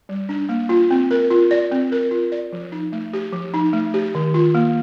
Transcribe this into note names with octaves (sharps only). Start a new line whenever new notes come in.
G3
D4
A#3
F4
C4
A#4
F4
D5
C4
A#4
F4
D5
F3
D#4
A3
G4
F3
D#4
A3
G4
D#3
F4
A#3